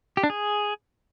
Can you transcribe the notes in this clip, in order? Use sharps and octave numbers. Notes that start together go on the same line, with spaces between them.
G4
D4
G#4